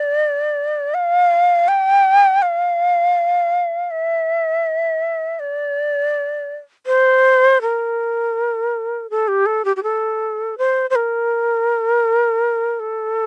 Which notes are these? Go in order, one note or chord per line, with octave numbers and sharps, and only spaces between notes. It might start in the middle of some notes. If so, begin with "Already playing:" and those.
Already playing: D5
F5
G5
F5
E5
D5
C5
A#4
A4
G4
A4
G4
G4
A4
C5
C5
A#4
A4